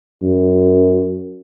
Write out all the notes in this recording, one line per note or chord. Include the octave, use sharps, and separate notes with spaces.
F#2